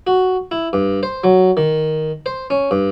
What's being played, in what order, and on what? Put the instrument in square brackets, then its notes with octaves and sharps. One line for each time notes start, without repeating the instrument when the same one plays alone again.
[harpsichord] F#4
E4
G2
C5
F#3
D#3
C5
C#4
G2